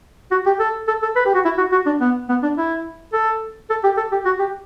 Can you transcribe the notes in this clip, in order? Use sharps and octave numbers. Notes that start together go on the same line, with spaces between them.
F#4
G4
A4
A4
A4
B4
G4
F#4
E4
F#4
F#4
D4
B3
B3
D4
E4
A4
A4
G4
A4
G4
F#4
G4